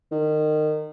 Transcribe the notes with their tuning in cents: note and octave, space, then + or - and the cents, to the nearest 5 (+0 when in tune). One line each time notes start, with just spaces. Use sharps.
D#3 -25